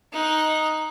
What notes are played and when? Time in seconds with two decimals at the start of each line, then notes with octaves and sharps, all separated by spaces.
0.12 D#4 F#6